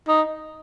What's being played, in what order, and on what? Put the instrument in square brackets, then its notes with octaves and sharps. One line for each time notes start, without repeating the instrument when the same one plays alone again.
[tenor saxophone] D#4